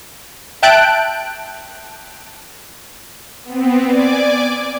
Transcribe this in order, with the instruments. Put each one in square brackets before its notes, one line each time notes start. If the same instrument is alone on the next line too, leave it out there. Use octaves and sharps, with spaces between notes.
[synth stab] E5 G5 A5 F#6 G6 D7
[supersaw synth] B3 C4
D5 G#5 D6